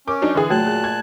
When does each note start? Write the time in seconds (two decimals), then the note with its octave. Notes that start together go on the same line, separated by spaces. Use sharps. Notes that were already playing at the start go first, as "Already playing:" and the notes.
0.08 C#4 A#4 D6
0.22 F#3 D4 D#4
0.35 D3 E3 G#4
0.50 A#2 F#3 A3 A5 F#6
0.67 G#4
0.84 G#6